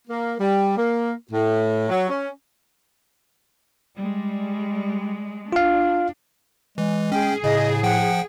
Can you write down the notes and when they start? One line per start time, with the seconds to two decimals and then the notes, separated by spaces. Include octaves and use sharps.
0.08 A#3
0.40 G3
0.77 A#3
1.31 A2
1.89 F#3
2.10 C#4
3.97 G3 G#3
5.53 D4 F4 F5
6.78 E3 G#3
7.12 C#4 G#4 G5
7.44 A2 C#3 D#5
7.83 F3 F#5 G5